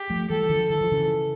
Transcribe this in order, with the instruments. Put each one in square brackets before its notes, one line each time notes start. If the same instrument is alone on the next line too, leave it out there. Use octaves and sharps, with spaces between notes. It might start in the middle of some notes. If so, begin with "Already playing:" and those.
Already playing: [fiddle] G4
[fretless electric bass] F3 A3
[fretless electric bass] E3 G3 [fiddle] A4
[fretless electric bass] D3 F3
[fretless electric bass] E3 [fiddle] A4
[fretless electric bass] F3
C#3 E3